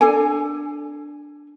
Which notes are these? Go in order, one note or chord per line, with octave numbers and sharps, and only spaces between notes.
D4 A4 G#5